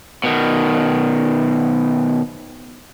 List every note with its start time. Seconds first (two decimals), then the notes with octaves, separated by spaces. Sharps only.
0.24 B2 D#3